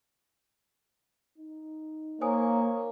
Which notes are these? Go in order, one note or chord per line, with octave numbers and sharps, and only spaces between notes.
D#4
A#3 C5 C#5 G#5 D#6